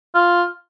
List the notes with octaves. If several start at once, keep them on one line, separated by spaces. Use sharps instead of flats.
F4